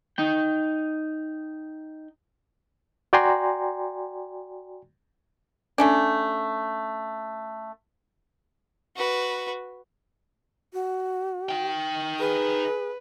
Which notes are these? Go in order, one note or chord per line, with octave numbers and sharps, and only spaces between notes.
D#4 G5
F#4 D5 G5 G#5 A#5 C6
A3 C#4 D4
F#4 B4
F#4
D#4 G5
G#4 B4